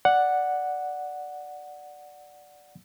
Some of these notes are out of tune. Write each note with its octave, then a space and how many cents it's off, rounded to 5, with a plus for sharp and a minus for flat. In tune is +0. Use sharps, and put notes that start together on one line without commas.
D5 +0 F#5 +0